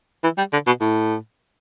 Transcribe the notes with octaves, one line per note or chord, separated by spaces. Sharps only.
E3
G3
D3
B2
A2